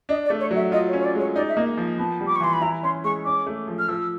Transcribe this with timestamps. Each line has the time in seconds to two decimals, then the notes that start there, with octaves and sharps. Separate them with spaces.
0.09 D4 D#5
0.25 D5
0.30 A3
0.40 C#5
0.51 F#3
0.56 E5
0.72 F4 D#5
0.89 C#5
0.93 C#4
0.99 C#5
1.04 D5
1.15 G#3 C#5
1.35 D#4 D5
1.49 E5
1.56 A#3 D#5
1.77 F3
1.98 B3 A5
2.20 G3
2.26 D6
2.35 C#6
2.40 E3 C6
2.53 B5
2.61 E4 A#5
2.83 C#4 C6
3.04 G#3 C#6
3.25 C#4 D6
3.47 A3
3.67 F3
3.79 F6
3.88 F3 E6